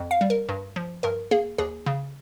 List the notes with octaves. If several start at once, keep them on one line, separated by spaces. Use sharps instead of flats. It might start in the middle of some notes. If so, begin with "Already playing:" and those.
Already playing: F2
F5
G3
A#4
G2
F3
G2 A#4
A#3 G#4
D#2 G#4
C#3